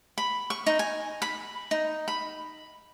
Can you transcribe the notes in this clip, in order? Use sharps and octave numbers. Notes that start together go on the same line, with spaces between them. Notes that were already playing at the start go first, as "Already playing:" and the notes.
B5
C#6
D#4
G#5
B5
D#4
B5